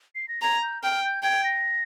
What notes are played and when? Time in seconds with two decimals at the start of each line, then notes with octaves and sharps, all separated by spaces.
0.15 C7
0.28 A#6
0.42 A#5 G#6
0.63 G6
0.82 G5 F6
1.04 G6
1.23 G5 G#6
1.44 A#6